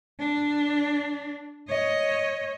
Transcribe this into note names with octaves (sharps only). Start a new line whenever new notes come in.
D4
C#5 D#5